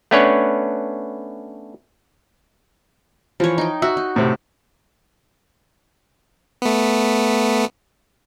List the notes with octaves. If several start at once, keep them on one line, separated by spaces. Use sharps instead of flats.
A3 B3 C#4 D4 B4 C#5
E3 F3 C#5
D#4 G5
F#4 E5
D#4
A2 C3
A3 B3